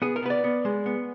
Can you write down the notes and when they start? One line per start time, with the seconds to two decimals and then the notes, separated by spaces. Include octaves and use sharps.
0.02 B3 G#4
0.16 A#4
0.23 B3 B4
0.30 D5
0.44 B3
0.65 G#3
0.86 B3